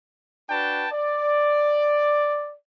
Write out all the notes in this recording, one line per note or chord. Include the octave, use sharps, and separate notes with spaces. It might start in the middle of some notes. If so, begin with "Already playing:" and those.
D4 F#4 B4 G5 A5
D5